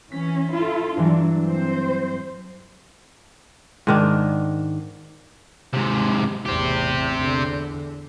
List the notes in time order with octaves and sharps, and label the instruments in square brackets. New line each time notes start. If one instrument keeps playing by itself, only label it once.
[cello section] E3 C#4 [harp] B6
[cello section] E4 F4 A4
[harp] G2 E3 F#3 [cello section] D4
[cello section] C4 C5
[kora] G#2 D#3 D4
[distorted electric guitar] G#2 C3
[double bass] A1 E2 [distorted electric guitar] C4 G4
[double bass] E2 D3